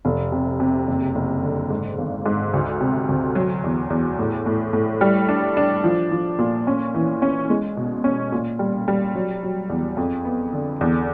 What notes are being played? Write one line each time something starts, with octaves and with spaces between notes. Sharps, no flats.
F1
C3
C3
F#1
F#1
D3
G#2
G#1
G#2
D2
C3
D2
F#3
E2
E2
A2
A2
A2
G3
D4
D4
F3
F3
A#2
C#4
E3
C#4
G#3
B2
C#4
A#2
G3
G3
F#3
F#3
E2
F2
B3
D3
E2